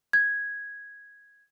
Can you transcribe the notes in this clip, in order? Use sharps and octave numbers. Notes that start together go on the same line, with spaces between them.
G#6